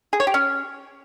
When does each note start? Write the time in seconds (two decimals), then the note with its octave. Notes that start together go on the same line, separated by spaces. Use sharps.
0.13 G#4
0.20 C#5
0.27 G4
0.34 C#4